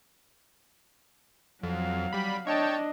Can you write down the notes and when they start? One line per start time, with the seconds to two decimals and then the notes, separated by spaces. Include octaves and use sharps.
1.63 F2 F#3 F5
2.13 G3 B5
2.47 D4 C#5 D#5 G5 A5